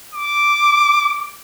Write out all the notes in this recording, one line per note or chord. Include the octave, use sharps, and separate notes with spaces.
D6